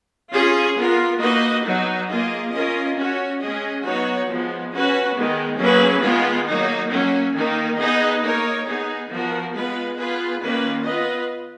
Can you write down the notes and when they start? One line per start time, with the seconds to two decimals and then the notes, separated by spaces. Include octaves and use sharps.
0.33 C#4 F4 G#4
0.76 B3 F4 A#4
1.20 A#3 D#4 F#4 B4 D#5
1.64 F#3 B3 D#4
2.08 A#3 F4 G#4 D#5
2.52 C#4 F4 A#4 D#5
2.96 C#4 F#4 C#5
3.39 G#3 C#4 G#4 D#5
3.83 F#3 B3 D#4 F#4 C#5
4.27 F3 G#3 B3
4.71 C#4 F#4 B4
5.14 D#3 G#3 B3
5.58 F#3 A#3 C#4 G#4 B4
6.02 D#3 G#3 B3 F4
6.46 F#3 A#3 D#4
6.90 F#3 A#3 C#4
7.34 D#3 A#3 D#4
7.78 B3 D#4 G#4 B4 D#5
8.22 A#3 D#4 A#4 C#5
8.66 B3 D#4 G#4
9.09 F3 B3 F#4 A#4
9.53 G#3 B3 F4 B4
9.97 B3 F4 G#4 B4
10.41 D#3 A#3 C#4 F4 B4
10.84 B3 F4 B4 D#5